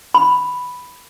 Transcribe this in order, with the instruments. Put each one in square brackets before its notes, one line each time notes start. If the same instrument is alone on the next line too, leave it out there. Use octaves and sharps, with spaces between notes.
[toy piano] B5